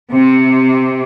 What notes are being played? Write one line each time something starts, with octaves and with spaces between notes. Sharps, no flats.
C3